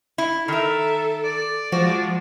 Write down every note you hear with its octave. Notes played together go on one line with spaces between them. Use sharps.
E4
D#3 A4 A#4 E5
D5
F3 G#3 F#4